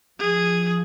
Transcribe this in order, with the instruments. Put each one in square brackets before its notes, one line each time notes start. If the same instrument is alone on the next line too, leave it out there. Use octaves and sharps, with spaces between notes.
[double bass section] F3 [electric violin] G#4